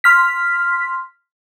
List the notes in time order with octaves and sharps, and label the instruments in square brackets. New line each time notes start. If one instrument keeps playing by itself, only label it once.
[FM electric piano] C6 F6 B6